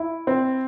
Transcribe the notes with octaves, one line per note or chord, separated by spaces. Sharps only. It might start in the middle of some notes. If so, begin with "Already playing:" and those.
Already playing: E4
C4